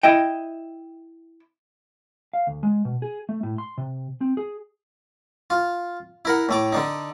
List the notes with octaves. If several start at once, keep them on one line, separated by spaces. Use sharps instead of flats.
E4 D#5 G5
F5
D2
G#3
B2
G#4
A3
A2
C6
C3
C4
G#4
F4
E4 A#4 F#5
A2 A3 D6
D3 D4 D#4